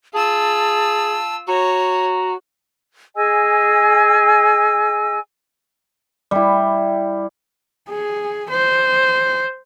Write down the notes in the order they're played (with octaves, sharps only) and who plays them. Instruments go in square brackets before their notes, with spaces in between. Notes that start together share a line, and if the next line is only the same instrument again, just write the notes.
[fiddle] F4 E6 [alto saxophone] G#4 [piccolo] A5
[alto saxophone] F#4 [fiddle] C#5 [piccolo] A#5
[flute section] G#4 D#5 G#5 E6
[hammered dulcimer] G3 E4
[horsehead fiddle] G#4
C5